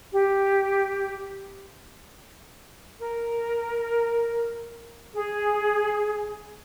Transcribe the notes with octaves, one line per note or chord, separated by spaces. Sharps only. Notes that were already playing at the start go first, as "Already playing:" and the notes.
G4
A#4
G#4